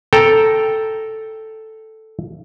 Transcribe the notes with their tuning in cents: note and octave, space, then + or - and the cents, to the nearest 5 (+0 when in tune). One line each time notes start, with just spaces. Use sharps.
A4 +0 G5 +0 A#5 +0